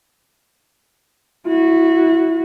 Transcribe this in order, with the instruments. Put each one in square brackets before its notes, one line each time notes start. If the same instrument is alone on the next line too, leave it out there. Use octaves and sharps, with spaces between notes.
[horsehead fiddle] E4 F#4